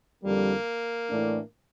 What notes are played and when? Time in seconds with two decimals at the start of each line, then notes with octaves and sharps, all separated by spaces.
0.23 F2 D3 G3 A#3
1.08 A2 E3 A3 D4